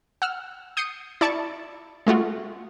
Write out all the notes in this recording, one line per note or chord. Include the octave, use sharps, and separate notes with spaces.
F#5 E6 F6
D#6 G6 C7 C#7 D#7
E4 D5 A5 C#6 D7
G#3 A3 F4 F#4